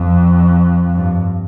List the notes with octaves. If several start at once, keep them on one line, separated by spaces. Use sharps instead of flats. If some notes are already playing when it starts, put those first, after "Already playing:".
Already playing: F2
G2